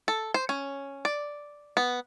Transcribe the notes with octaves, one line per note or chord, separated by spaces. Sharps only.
A4
C5
C#4
D5
B3